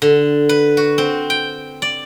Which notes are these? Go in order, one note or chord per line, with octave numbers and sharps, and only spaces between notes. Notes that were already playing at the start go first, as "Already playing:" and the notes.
D3
B4
F#4
C4
G5
D5